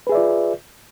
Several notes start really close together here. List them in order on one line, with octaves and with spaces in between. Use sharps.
B4 G#4 E5 D5 F4